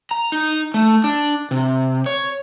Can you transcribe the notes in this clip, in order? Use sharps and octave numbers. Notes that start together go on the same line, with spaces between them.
A#5
D#4
A3
D4
C3
C#5